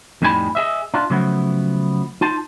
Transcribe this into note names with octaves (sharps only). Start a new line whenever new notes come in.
F2 A2 G3 D#4 G#5 B5
G#4 D#5 E5
D4 F4
C#3 F3 F#3 A3 B3
D#4 F4 A5